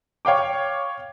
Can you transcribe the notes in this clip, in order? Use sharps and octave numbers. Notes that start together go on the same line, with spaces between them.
C#5 F5 G5 D6